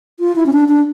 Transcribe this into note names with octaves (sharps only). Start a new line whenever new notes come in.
F4
E4
C#4
D4
D4